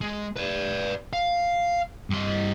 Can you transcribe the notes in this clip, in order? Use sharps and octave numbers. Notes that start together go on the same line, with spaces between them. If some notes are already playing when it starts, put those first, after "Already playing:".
G#3
B4 D5
F5
G2 D#5